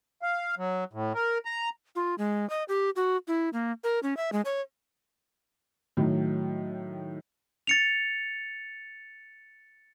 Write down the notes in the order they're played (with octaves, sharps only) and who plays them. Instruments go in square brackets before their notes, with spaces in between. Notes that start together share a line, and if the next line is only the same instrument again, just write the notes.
[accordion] F5
F#3
A2
A#4
A#5
[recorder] F4
G#3
D#5
G4
F#4
E4
A#3
A#4
C#4
E5
G#3
C#5
[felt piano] A2 D#3 F#3
[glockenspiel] A6 C#7 F7